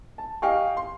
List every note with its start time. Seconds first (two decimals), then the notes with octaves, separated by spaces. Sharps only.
0.18 A5
0.42 G4 D#5 F5 G5 G#5 C#6
0.77 C6